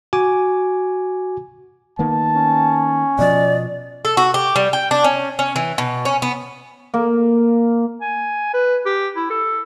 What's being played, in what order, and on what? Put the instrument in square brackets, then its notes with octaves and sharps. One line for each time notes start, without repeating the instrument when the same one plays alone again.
[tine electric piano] F#4 G#5 D6
[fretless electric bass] D#3 A#3 B3 [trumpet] A5
[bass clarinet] C#4
[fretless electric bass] B2 F3 [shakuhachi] D5 [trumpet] D#5
[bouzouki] A4
F#4
G4
G3
G5
D4
C#4
C#4
E3
B2
C#4
B3
[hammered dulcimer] A#3
[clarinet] G#5
B4
G4
E4
A4